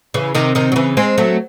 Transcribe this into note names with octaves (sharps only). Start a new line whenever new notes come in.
C#3 E3
C3 D#3
C3 D#3
F#3
C#3 E3
G#3 C4
F#3 A3